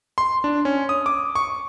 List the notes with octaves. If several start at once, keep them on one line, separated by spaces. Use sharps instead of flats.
C6
D4
C#4
D#6
D6
C#6